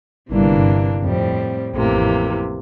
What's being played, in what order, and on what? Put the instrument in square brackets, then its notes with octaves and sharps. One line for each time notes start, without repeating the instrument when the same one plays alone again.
[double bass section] G1 G2 [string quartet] C3 E3 A#3 D4
[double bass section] F2 [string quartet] A2 G3 C4
[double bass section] A1 A2 [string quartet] F2 C3 E3 A#3